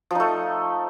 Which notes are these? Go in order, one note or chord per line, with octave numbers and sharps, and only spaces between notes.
F3 A3 D#4